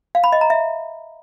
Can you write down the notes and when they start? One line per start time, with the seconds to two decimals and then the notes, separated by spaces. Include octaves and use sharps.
0.15 F5
0.24 B5
0.32 D#5
0.41 A#5
0.50 E5